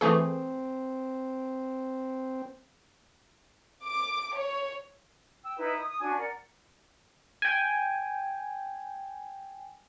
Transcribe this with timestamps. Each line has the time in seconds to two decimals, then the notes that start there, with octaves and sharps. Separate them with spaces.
0.01 E3 A3 C4 G#4
3.84 D6
4.36 C#5
5.43 G5 E6
5.57 D#4 E4 B4
5.75 D#6
5.87 D#6
5.99 C#4 D4 F#4 G#5
6.16 A#4 D5 F#5
7.42 G5 G#5